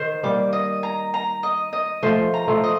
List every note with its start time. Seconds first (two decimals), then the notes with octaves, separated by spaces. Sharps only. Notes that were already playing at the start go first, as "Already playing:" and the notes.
Already playing: D#3 C5
0.23 G3 A#3 D6
0.53 D#5
0.83 A#5
1.14 A#5
1.43 D#5
1.73 D#5
2.03 F3 A3 C5
2.34 A#5
2.48 F3 A3
2.64 D#5